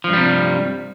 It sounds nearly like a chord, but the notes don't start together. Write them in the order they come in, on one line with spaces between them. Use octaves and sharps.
F3 G2 G3 C3